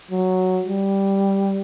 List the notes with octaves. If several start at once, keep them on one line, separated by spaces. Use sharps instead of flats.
F#3
G3